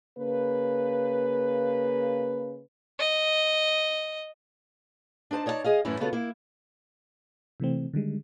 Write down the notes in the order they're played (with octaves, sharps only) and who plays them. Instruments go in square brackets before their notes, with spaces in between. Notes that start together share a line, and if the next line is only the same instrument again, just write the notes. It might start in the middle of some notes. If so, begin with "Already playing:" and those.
[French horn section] C#3 A#3 B4
[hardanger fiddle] D#5
[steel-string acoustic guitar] D4 D#4 C5 A5
D#4 C#5 D5 E5 A5
G#4 D#5 F5
F#2 A2 E3 A3 C#4 E4
C#3 B3 F4 F#4 A4 C#5
A#3 E4
[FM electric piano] C3 E3 A3 C4
D3 D#3 G3 G#3